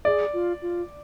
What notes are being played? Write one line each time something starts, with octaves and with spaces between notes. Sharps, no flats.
G#4 D5
F4
F4